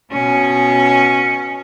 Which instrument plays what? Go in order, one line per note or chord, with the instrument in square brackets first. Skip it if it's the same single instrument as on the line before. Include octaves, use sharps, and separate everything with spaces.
[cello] B2 C#4